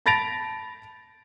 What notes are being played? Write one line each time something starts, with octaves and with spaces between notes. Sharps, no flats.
A5 B5 A6 A#6 D7 F7